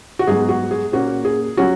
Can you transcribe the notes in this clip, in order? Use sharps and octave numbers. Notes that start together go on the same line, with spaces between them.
F#4
G#2 F#3 B3 G#4
F#4
G#4
A#2 A#3 C#4 F#4
G#4
F#3 C#4 F#4